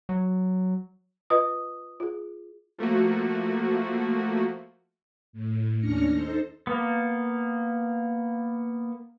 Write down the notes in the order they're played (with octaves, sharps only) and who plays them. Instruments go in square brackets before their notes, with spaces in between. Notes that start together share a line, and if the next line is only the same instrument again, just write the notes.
[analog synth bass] F#3
[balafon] F4 B4 D#5 [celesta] D#6
[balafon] F4 G#4
[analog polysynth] F3 A3 A#3 F#4
[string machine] A2
D#2 C#4 D4 F6 A#6 C#7
D#4 A4 C5
[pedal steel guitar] A#3 B3